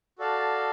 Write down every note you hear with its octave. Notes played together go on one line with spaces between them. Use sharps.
F#4 A4 D5 F5 A5